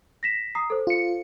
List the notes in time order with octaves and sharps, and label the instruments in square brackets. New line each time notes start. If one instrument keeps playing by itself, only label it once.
[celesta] A#6 B6 E7
A#5 D#6 C7
A4 C5
[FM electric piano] F4 C#7